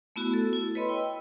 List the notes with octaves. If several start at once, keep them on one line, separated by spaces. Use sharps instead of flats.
A3 B3 E4 F#4
A4
E4
B4 C#5 D#5 B5 C6
G5 E6